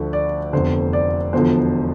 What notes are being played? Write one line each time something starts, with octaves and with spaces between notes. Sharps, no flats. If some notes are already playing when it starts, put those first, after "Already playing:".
Already playing: D2 D3 F3
D5
F1 E2 D3 C5
D5
E1 E2 D3 F3 C5